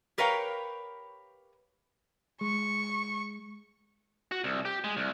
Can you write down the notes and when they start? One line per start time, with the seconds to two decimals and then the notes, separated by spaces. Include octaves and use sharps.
0.18 G4 A#4 B4 C#5 F5 G5
2.41 G#3 C#6
4.31 F#4
4.44 C2
4.65 G4
4.84 G#3
4.97 C2